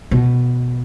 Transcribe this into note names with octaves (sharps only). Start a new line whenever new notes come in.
B2